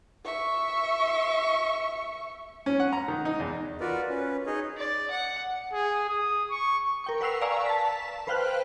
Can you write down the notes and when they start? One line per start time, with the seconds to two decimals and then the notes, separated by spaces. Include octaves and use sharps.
0.25 E5 C#6
2.66 C#4
2.80 F#5
2.93 A#5
3.08 D#3
3.25 D#4
3.40 E2
3.80 F4 F#4 A#4 B4 D5
4.09 C#4 B4
4.47 D#4 G#4 C#5 D#5
4.78 D5
5.10 F#5
5.73 G#4
6.09 D#6
6.50 C#6
7.04 A#4 G5 C#6
7.21 B4 F#5 E6 C7 F7
7.41 D5 F5 G#5 A#5 C#6 E6
7.66 A5 B6
8.27 B4 C5 F5 G5 F6 F#6